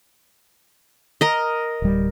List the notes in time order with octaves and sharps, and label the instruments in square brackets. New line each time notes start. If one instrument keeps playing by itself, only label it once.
[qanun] A#4 D#5
[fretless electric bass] D1 G3